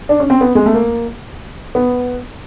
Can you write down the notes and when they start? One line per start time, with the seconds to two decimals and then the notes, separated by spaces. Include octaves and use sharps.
0.09 D4
0.20 C#4
0.30 C4
0.41 B3
0.55 G#3
0.66 A3
0.74 A#3
1.75 B3